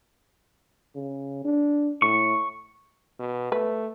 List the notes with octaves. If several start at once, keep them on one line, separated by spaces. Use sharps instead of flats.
C#3
D4
A2 C#6
B2
A3 B4